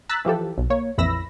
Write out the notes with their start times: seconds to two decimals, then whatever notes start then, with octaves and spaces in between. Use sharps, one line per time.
0.09 A#5 E6 F#6 A6 B6
0.25 E3 F3 G4 A4
0.58 B1
0.70 A#3 C#5
0.98 A#1 F2 E3 B5 E6 A#6